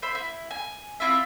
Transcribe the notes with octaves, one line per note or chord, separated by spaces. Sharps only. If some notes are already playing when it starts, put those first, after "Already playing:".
C5 E5 B5
E4
G#5
C4 E4 F4 E5